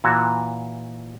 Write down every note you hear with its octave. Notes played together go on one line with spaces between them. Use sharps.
A#2 E3 F#4 A5